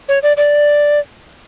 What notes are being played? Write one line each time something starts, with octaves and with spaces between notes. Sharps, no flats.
C#5
D5
D5